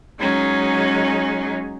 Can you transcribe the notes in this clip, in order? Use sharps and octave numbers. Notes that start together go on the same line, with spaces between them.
F#3 G#3 C#4 D#4